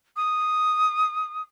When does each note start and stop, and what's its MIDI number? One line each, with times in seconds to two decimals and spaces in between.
0.16 1.42 87